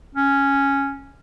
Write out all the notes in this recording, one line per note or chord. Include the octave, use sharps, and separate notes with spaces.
C#4